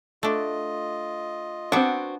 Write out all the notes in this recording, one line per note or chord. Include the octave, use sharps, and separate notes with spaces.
A3 D4 F4 D#5
B3 C4 D4 F#4